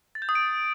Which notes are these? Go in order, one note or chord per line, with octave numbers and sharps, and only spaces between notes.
A6
G6
D#6
D7